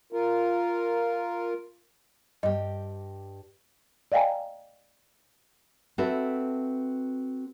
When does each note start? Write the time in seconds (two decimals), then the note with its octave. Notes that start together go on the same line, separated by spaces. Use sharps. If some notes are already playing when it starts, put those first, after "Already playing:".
0.13 F4 A#4
2.43 G2 G4 D#5
4.12 D5 D#5 F5 G5 G#5 A#5
5.98 C4 F#4 A4 B4 E5